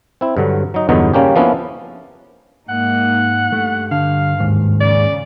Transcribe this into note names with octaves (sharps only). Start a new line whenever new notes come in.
C4 E4
G2 D3 F#3
F#3 D#4
E2 G2 D3 F#3 B3 D#4
C#3 G3 A#3 C#4 G4
F3 A#3 B3 C#4 D4 E4
G#2 A#3 D#4 F#5
G2 A3
D3 F5
D#2 G#2
C#3 D5